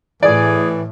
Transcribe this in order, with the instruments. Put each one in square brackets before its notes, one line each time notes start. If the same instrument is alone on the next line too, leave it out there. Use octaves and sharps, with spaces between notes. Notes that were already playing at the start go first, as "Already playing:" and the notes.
[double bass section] A2 [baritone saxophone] E3 [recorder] G#4 [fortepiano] D5